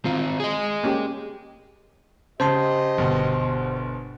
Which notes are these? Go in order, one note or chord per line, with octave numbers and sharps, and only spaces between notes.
D#3 C4 F4
G#4 D#5
A#3 C#4 G4
C#3 G4 C5 D#5 A5 C6
G1 B2